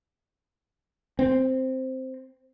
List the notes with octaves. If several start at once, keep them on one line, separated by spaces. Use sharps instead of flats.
C4